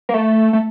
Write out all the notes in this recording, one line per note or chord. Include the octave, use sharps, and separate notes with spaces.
A#3
A3
A3